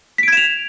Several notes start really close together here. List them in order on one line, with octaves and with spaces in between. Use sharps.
B6 D7 G#6 E7 F7